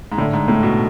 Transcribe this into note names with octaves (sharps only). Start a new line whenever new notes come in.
G#2
A2 D3
G#2
A2 A3
B2